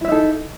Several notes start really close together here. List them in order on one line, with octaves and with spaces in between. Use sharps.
E4 E5 D#4 A4